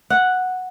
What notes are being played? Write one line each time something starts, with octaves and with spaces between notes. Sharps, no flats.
F#5